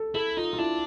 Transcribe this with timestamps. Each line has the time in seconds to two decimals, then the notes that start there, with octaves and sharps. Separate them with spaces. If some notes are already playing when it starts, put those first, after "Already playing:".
Already playing: A4
0.15 E4 A4
0.37 D#4 F4
0.53 F4
0.58 D4 E4